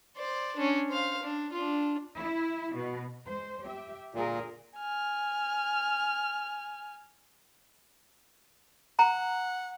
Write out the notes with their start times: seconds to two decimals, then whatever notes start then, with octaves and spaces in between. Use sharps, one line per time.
0.17 C5 D5
0.56 C#4 D4
0.90 C5 F5
1.23 D4
1.52 D4 F4
2.18 E4
2.75 B2
3.26 G#3 C5
3.63 G4 E5
4.14 A#2 D3 G#4 A#4
4.78 G#5 F6
8.99 F#5 A#5